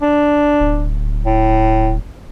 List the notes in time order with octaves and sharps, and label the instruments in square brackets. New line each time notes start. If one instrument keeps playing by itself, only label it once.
[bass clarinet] D4
[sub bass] D1
[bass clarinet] A2